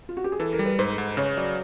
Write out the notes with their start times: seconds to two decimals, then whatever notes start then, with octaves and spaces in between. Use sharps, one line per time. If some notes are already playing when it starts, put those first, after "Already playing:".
0.09 F4
0.17 F#4
0.24 G4
0.32 G#4
0.39 E3 A4
0.53 A#4
0.59 G3
0.66 B4
0.79 G#2 C5
0.98 G#2
1.17 C#3 C#5
1.37 F#3 D5